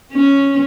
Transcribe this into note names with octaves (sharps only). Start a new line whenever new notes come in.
C#4